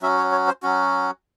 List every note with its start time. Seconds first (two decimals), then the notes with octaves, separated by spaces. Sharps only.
0.02 F#3 C#4 F#4 E5
0.18 C#5
0.32 C#5
0.47 C5
0.63 F#3 C#4 F#4